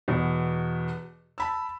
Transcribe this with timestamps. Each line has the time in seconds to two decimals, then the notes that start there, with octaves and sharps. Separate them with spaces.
0.08 E2 B2
1.38 A5 B5 E6